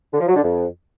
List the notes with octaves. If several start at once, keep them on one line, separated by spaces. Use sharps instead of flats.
D3
F3
F#3
D3
F2